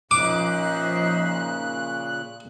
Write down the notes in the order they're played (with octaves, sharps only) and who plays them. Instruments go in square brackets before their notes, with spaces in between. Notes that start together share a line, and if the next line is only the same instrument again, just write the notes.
[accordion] A#2 C#3 F#6 [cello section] F3 C5 E5 [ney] D#4 [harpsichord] D6